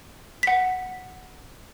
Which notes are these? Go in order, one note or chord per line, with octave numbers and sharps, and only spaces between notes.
F#5 B6